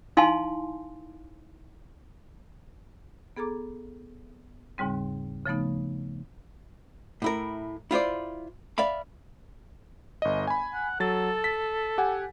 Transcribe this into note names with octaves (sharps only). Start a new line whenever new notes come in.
D#4 E4 F5 G#5 A5 C6
B3 G#4 A4 A#5 D6
D#2 G#2 C#3 G3 C4
C#3 F3 A3 B3 D#4
A2 E4 A#4
E4 F4 C5 D5
D5 E5 F5 B5
G1 D#5
G#5 B5
F#5
F#3 A4 A6
B6
G4 F#5 G#5